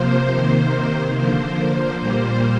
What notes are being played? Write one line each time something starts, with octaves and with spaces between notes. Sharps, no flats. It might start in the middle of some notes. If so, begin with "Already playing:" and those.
Already playing: C3 F3 A#3 C5
C3 D#3 A#3
D3 F3 A#3 C5
A#2 G3 A#3 C5